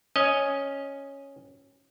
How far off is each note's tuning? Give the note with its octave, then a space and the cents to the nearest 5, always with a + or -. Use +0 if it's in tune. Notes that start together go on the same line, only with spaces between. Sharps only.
C#4 +0 D#5 +0